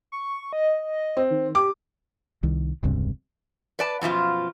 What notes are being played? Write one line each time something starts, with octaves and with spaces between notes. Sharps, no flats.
C#6
D#5
C4
D#3
G4 D6
C2 D#3
E1 C#2 G2 C3
B4 D5 A5
F#2 B2 F3 F4